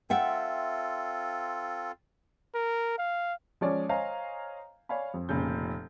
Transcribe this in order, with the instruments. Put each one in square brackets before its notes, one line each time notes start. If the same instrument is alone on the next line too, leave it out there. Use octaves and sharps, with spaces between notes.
[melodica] C4 F4 A4 [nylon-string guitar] E5 F#5 G5
[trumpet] A#4
F5
[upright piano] F3 G#3 C#4 C#5 D5
C5 C#5 D#5 F5 G#5 A#5
C#5 D5 F5 G#5 B5
F2
F1 A#2 C#3 G6